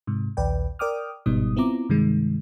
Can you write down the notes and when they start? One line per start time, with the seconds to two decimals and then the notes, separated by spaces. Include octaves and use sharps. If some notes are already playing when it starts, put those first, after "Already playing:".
0.07 G#2 C3
0.37 A#1 D#2 B4 D5 G5
0.79 A#4 D5 G5 D6 D#6 F6
1.26 G1 G#2 B2 G3 D#4 D#6
1.56 B3 C4 E4 F4 A#5 D6
1.89 G2 C3 D#3 G#3